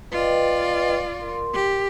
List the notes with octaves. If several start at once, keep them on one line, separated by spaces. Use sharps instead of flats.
F4 B4 D5 D#5 G5
A#4 C6
G4